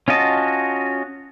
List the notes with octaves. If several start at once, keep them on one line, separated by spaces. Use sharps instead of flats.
C#4 F4 F#4 D#5 A5